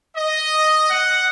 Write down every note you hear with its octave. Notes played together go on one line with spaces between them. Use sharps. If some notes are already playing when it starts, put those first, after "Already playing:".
D#5
F#5